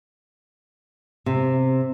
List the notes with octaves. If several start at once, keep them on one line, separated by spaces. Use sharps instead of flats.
C3